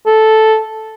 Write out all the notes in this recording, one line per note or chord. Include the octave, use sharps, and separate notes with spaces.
A4